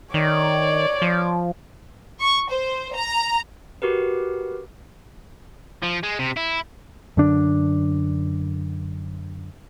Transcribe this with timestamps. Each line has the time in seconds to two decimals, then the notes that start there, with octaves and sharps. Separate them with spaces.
0.14 D#3 C#5 D5
1.02 F3
2.20 C#6
2.50 C5
2.93 A#5
3.82 F#4 G4 A#4 B4
5.82 F3
6.03 G#3
6.19 C3
6.37 E4
7.17 F#2 D3 D4